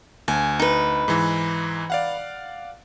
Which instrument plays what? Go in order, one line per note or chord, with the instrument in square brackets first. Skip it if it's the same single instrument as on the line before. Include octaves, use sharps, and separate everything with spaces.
[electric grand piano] D2 [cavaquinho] G#5
[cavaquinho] D#4 B4
[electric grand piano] G#2 E3
D5 F5 F#5